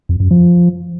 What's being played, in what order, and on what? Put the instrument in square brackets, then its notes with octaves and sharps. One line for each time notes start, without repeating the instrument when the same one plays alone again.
[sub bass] F2
F#2
F3